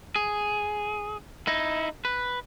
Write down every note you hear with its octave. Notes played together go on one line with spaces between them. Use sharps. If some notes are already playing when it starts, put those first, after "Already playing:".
G#4
D#4 E4
B4